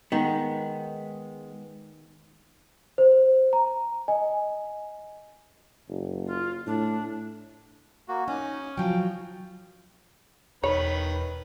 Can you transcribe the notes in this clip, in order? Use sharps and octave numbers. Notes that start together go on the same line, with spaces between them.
D#3 G#3 B3
C5
A#5
D#5 G#5
F#1
F4
A2 D4
A#3 F#4
C#4 D#4
F3 F#3 G5
E1 D#3 B4 C#5 B5